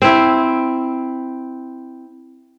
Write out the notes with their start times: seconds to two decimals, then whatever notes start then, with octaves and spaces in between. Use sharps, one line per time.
0.02 C4 E4